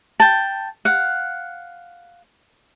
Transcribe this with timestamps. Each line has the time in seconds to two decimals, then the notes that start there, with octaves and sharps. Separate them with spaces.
0.20 G5 A5
0.85 F5 F#5